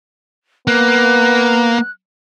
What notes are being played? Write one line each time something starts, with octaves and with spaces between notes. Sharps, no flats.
A#3 B3 F#6